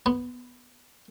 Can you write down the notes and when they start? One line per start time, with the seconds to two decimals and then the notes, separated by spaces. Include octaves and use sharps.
0.06 B3 B4